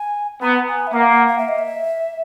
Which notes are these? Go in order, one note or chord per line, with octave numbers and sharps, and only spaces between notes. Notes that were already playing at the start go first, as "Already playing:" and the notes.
Already playing: G#5
B3 A#5
G#5
E5
A#3 F#5
F#5
F#5
E5
D#5
E5